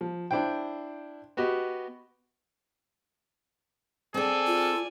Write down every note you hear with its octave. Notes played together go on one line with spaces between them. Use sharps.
F3
D4 E4 C5 G5
B3 F#4 G4 D#5
C4 G#4 A4 D5 G#5
F4